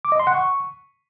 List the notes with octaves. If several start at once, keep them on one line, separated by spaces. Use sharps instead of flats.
D6
D#5
C6
F#5
C#6